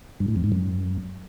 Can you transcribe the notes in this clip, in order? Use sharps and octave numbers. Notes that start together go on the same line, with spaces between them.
G2
A2
F2
G#2
F#2